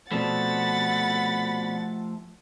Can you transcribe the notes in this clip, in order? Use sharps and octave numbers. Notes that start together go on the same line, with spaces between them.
B2 F3 A3 C4 D5 F#5 B5 A6